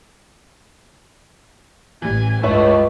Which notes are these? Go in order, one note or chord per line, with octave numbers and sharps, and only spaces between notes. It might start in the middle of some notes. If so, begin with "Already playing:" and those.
A1 E3 G3 G#5
C#2 G2 A3 E4 B4 C#5